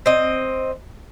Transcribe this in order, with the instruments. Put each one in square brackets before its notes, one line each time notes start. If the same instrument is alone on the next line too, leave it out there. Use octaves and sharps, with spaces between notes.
[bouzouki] C4 D#5